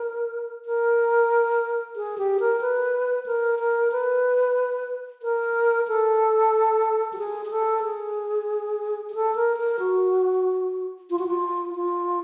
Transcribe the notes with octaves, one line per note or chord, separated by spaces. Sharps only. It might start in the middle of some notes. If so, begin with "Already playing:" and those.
Already playing: A#4
A#4
G#4
G4
A#4
B4
A#4
A#4
B4
A#4
A4
G4
G#4
G#4
A4
G#4
G#4
A4
A#4
A#4
F#4
F4
F#4
F4
F4